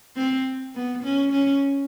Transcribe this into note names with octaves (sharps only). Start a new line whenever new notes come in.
C4
B3
C#4
C#4